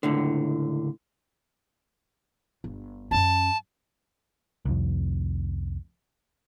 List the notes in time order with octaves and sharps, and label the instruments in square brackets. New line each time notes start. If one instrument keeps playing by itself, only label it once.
[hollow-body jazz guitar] C#2 A2 D3
[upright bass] G1
[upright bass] F#2 C#4 [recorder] A5
[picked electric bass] C2 F2